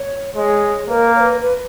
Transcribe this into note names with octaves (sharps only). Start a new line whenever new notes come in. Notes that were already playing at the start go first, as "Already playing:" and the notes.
Already playing: C#5
G#3 C#5
A#3 B4
A#4
C#5
B4
B4